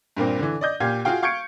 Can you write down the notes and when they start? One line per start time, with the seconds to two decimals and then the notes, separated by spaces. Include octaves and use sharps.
0.17 G2 A#2 A#3 C4
0.39 D3 E3
0.61 D5 D#5 G6
0.80 A#2 G4 F5 G#6
1.05 F4 F#4 G#4 F5 G5
1.23 F5 C#6 G6 G#6 C#7 D7